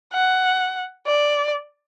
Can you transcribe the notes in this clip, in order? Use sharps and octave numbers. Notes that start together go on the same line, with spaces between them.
F#5
D5